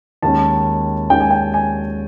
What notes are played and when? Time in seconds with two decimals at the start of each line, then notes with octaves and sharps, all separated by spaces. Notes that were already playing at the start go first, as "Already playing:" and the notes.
0.22 D#2 D#3 G#3 C#4 A5
1.10 D#2 D#3 G#3 C#4 G5
1.20 G#5
1.31 G5
1.54 G#5